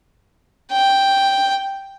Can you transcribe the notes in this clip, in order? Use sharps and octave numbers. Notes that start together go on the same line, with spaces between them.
G5